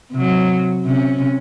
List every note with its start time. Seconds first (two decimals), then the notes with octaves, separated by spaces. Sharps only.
0.12 C3 F#3
0.84 C3 C#4